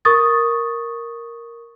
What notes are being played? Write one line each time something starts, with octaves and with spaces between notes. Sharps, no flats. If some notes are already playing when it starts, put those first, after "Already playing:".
A#4 C#6 D#6 A6